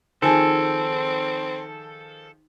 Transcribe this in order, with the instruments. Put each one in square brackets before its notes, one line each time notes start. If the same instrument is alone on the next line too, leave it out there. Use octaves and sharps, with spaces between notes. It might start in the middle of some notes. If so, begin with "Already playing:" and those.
[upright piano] D#3 F3 G#4 [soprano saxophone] C4 [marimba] D#4 G#5 A5 [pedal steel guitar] A4